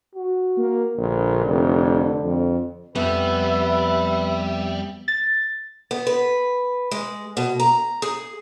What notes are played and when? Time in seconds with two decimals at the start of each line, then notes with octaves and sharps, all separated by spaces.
0.15 F#4
0.57 A#3
0.97 A#1 D3
1.46 F1
2.24 F2
2.95 F2 G3 B3 B4 E5
5.08 A6
5.91 B3
6.07 B4
6.91 G#3
7.37 B2
7.60 A#5
8.02 G#4